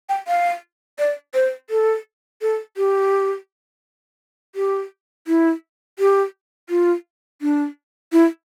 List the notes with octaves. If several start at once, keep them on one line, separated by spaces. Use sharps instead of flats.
G5
F5
D5
C5
A4
A4
G4
G4
E4
G4
F4
D4
E4